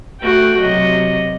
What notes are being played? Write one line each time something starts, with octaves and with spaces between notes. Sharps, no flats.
A3 F#4 G5
C3 F#3 D#5